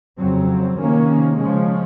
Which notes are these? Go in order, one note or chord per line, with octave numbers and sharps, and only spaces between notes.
F2 C#3 F#3 C4
C3 D#3 A#3 C#4
C#3 F3 G#3 C#4